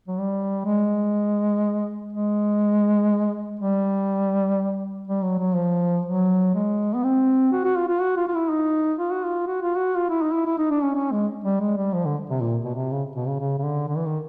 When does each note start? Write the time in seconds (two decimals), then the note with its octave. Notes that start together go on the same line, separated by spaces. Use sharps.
0.08 F#3
0.18 G3
0.66 G#3
2.13 G#3
3.60 G3
5.07 G3
5.23 F#3
5.39 F#3
5.55 F3
6.06 F#3
6.54 G#3
6.95 B3
7.04 C4
7.52 F#4
7.65 F#4
7.77 F4
7.88 F4
8.01 F#4
8.17 F4
8.28 F4
8.34 E4
8.49 D#4
8.99 F4
9.11 F#4
9.24 F4
9.47 F#4
9.62 F4
9.76 F#4
9.97 F4
10.10 E4
10.22 D#4
10.33 E4
10.46 E4
10.58 D#4
10.71 D4
10.83 C#4
10.95 C#4
11.12 G#3
11.44 G3
11.60 G#3
11.77 G3
11.93 F3
12.05 D3
12.30 C3
12.41 A#2
12.64 B2
12.74 C3
12.91 C#3
13.15 B2
13.27 C#3
13.39 C#3
13.58 C#3
13.64 D3
13.88 D3
13.97 E3
14.05 D#3